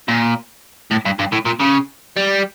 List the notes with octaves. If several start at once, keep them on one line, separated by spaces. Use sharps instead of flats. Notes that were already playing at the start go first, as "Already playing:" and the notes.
A#2
A2
G2
G2
A2
A#2
C#3
G3